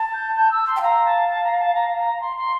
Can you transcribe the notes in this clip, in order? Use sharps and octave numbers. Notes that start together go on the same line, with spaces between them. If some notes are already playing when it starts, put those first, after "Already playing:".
Already playing: A5
G6
G6
E6
C6
G5
F5 A#5
A5
A5
A#5
A5
A#5
A#5
C6
C6